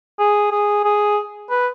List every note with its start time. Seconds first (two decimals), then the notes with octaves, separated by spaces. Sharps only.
0.19 G#4
0.51 G#4
0.84 G#4
1.50 B4